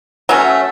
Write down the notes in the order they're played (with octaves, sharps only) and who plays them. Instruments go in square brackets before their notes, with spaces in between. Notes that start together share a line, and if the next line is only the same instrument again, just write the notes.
[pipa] F#3 A3 C#4